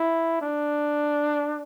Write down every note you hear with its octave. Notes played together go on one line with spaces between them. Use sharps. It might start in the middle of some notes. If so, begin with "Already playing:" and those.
Already playing: E4
D4